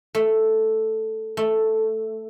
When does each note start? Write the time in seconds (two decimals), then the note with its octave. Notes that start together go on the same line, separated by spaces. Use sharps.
0.15 A3
1.37 A3